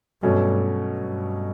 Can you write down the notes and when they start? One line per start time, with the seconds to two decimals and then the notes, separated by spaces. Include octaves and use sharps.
0.22 G2 B2 F#3 A3 C#4
0.98 G2